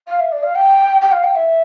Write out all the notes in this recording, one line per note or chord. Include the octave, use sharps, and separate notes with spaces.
F5
E5
D5
F5
G5
G5
F5
G5
E5